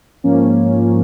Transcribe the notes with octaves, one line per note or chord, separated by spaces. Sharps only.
G#2 F3 A#3 C#4